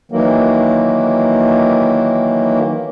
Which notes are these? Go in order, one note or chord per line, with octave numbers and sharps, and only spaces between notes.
D#3 E3 F#3 A#3